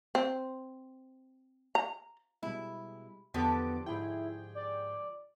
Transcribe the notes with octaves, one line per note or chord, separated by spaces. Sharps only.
C4
A#5
B2 G3 G#3 E4
E2 D3 F3 B3 G4 A4 D6
G#2 E4 G#4 G5
D5